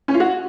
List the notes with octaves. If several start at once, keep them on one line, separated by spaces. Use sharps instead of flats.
C#4
F4
F#4